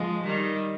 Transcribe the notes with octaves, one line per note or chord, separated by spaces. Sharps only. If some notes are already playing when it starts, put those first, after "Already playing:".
Already playing: F3 G#3
D#3 G3